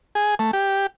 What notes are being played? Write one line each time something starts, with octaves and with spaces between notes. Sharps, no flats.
G#4
A3
G4